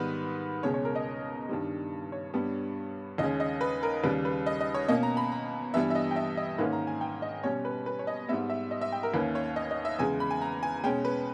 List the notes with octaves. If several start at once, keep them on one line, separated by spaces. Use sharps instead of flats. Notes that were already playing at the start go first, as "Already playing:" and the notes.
Already playing: G#2 D#3 G3 B3 B4
C#2 B2 G#3 C#4 C#5
C#5
A#4
D#5
G2 D#3 G3
C#5
G2 G3 B3
D#2 C#3 G#3 C#4 D#5
D#5
B4
A#4
D#2 C#3 G3 B4
B4
D#5
D#5
C#5
B2 A#3 C#4 D#5
A#5
B5
A#5
G2 E3 G3 B3 E5
E5
D#5
G5
E5
D#5
G#2 D#3 A#3 C#4 B4
A#5
G#5
G5
D#5
B2 G3 C#4 C#5
B4
B4
C#5
D#5
G#2 G3 B3 E5
E5
D#5
E5
G5
A#4
D#2 D#3 A#3 C#4 B4
C#5
D#5
D#5
E5
E2 C#3 G#3 G#5
B5
G#5
A#5
G#5
B2 G#3 C#4 G5
B4